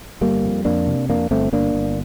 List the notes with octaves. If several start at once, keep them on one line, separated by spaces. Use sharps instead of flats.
G1 G3 A#3
F2
F2 A#3 D4
C3
F2 A#3 D4
G1 A3 C4
G1 A#3 D4
G1